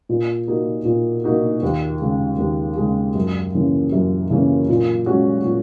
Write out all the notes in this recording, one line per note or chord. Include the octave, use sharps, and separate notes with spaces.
A#2
A#3 D#4 F#4
A#2
A#3 D#4 F#4
D#2
C#3 G#3
D#2
C#3 G#3
F#2
C#3 E3 A#3 C#4
F#2
C#3 E3 A#3 C#4
A#2
G#3 C#4 F#4
A#2